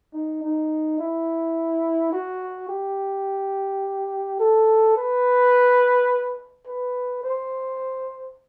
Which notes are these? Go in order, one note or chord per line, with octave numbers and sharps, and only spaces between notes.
D#4
D#4
E4
F#4
G4
A4
B4
B4
C5